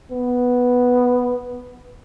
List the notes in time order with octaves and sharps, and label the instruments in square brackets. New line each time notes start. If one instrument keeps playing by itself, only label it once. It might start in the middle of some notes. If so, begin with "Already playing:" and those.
[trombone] B3